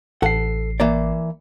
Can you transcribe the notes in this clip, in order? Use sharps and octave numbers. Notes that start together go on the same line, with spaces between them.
A1 A4 F#5 C7
E3 A#3 D5